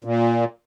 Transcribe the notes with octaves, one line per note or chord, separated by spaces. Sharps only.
A#2